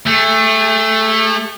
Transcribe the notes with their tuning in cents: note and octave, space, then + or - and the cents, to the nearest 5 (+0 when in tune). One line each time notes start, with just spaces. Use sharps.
A3 +0 G#4 -40